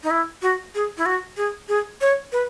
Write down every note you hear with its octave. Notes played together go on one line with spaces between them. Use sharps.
D#4
E4
F#4
G#4
E4
F#4
G#4
G#4
C#5
B4